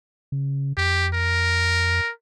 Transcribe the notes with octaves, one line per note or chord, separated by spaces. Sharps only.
C#3
F2 G4
A#4